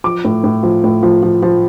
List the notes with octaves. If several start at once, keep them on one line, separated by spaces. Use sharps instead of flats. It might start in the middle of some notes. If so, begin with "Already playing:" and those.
F3 D6
A2
A2
F3
A2
F3
F3
F3